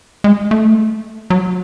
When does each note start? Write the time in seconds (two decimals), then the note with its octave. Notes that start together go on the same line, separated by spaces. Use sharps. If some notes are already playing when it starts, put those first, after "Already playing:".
0.24 G#3
0.51 A3
1.30 F#3